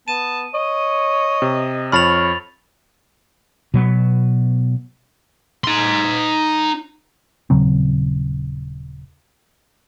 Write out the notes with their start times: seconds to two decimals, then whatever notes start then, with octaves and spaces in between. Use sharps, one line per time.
0.08 B3 A5 D#7
0.54 C#5 D#5
1.42 C3
1.92 F2 C#5 B5 F6 A6 F7
3.74 B2 F#3 B3
5.64 D#4 C6
7.50 D#1 C#3 F#3 C4